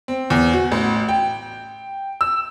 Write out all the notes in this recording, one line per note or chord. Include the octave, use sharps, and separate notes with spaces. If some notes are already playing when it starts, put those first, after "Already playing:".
C4
E2
F#4
A1
G5
E6